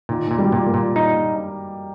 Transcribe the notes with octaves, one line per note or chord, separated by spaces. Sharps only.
A#2 D#3
A#2
G3
A#2
A#3
A#2
D#4